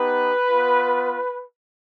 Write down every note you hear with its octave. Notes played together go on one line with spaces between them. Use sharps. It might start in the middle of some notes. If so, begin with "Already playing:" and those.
Already playing: B3 D#4 G4 B4
B3 F4